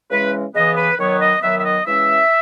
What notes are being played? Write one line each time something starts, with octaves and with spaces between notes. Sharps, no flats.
C#3 E3 G#3 C#4 B4
C#3 E3 B3 D#5
B4
D#3 F#3 B3 C#5
D#5
D#3 F#3 B3 E5
E5
D#5
C#3 E3 G#3 C#4 E5